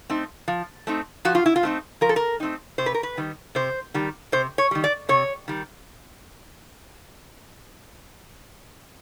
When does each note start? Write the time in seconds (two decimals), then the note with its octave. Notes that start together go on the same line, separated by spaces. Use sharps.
0.10 A3 C4 D#4
0.48 F3
0.87 A3 C4 D#4
1.25 F3 F#4
1.35 F4
1.46 E4
1.56 F4
1.63 A3 C4 D#4
2.01 F3 A#4
2.09 A4
2.16 A#4
2.40 A3 C4 D#4
2.78 C3 C5
2.86 B4
2.94 A#4
3.03 B4
3.17 D#3 G3
3.55 C3 C5
3.94 D#3 G3
4.32 C3 C5
4.58 C#5
4.71 D#3 G3
4.84 D5
5.09 C3 C#5
5.48 D#3 G3